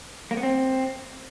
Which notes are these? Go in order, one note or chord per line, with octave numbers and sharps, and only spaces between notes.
A#3
B3
C4